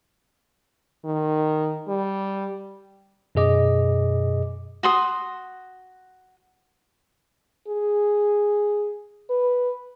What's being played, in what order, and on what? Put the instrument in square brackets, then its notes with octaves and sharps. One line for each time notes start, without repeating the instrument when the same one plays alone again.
[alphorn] D#3
G3
[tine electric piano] F#2 B2 G#4 D#5 D6
[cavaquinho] F#4 C6 D#6
[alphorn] G#4
B4